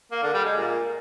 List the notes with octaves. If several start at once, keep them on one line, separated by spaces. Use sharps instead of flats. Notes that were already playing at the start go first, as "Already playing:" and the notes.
A#3
D3
G3
G#3
A#2